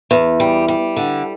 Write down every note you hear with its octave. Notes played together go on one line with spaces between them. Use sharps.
E2
G3
G3
D3